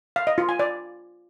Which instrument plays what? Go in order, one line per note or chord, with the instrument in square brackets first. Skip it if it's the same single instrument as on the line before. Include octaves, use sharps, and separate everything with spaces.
[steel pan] F5
D#5
F4
G#5
D5